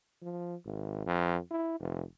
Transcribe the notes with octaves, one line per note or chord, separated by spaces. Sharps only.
F3
G#1
F2
E4
F1